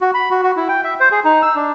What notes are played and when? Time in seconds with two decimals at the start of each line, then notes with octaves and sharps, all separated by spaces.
0.01 F#4
0.14 B5
0.31 F#4
0.43 F#4
0.57 E4
0.69 G5
0.84 E5
1.00 C5
1.12 G#4
1.25 D#4
1.42 E6
1.55 D4